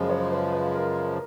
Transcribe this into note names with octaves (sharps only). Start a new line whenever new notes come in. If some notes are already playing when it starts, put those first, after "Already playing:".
Already playing: F#2 C#3 F3 G#3 D#5
C#5
B4
B4
A#4